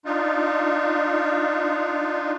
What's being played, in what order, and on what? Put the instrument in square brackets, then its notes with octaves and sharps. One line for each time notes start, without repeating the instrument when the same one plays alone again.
[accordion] D4 D#4 F4